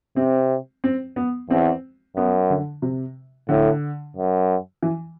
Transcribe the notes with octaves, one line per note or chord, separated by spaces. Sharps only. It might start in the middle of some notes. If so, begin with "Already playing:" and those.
C3 C4
C4
B3
E2 C4
F#2 B3
D3
C3
A2 D3
F#2
E3